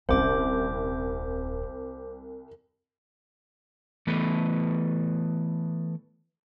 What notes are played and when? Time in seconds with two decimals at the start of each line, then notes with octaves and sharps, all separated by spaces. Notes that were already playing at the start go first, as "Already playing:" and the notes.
0.09 D#1 C2 C#4 C5 D6
4.07 E3 A3 B3 A4 B4